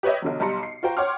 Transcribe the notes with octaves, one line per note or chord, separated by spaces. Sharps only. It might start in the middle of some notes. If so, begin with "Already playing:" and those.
G4 B4 C#5 D#5 E5
B1 D3 F#3
B1 G3 A5 A#5 C6 C#7
C7
F4 F#4 C5 G5 A#5
C#5 F#5 G5 C6 D6 F6